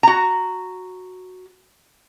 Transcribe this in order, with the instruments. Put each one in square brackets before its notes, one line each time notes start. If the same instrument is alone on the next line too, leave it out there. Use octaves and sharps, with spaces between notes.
[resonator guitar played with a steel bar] F#4 A#5